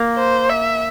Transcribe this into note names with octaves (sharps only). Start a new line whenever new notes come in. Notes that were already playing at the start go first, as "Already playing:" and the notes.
Already playing: A#3
C5
E5